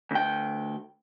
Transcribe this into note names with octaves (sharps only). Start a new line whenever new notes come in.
D2 G5